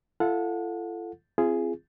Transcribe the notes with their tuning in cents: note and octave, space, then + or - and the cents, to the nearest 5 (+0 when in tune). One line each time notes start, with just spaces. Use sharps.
F4 -45 A4 +0 F#5 -35
C4 +0 F4 -35 G#4 +0